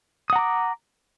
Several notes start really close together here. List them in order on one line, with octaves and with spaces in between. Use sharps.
D#6 F#5 A#5 D6